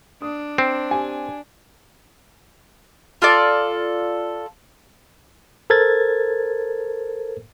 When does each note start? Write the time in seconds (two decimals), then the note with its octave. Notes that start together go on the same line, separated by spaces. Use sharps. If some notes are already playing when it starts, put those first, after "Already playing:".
0.22 D4 D#6
0.58 C4
0.91 G4 G#5
3.22 F4 A4 D5
5.70 A4 A#4 C5 G#6 A6